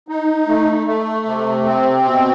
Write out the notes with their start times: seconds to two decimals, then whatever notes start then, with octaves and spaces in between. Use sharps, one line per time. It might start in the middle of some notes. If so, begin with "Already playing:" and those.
0.08 D#4
0.48 A3
0.87 A3
1.26 C3
1.65 C4
2.05 B2